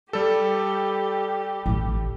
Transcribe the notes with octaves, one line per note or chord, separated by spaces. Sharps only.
G3 G4 A4
A1 E3